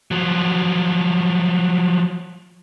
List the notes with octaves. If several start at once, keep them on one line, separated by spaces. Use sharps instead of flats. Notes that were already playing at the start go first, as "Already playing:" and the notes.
F3 F#3